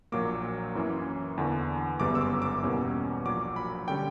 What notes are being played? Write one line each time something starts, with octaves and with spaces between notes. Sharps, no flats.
A#1 A#2 F#3 A#3 D6
F#2 E3 A#3 C#4
E2 D3 A#3
G1 F#2 C#3 G3 B3 D6
E6
D6
D6
E2 B2 G3 A#3 C#4
A#1 A#2 F#3 D6
B5
D3 G3 C#4 G5